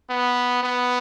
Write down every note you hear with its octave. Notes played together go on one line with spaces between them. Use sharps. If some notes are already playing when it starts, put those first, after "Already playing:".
B3
B3